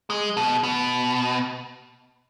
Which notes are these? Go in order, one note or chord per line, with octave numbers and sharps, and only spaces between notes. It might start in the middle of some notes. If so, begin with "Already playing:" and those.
G#3
B2
B2